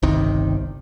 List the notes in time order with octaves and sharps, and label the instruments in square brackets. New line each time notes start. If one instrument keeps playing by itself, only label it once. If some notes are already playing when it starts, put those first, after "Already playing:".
[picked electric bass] G1 C2 C3 D#3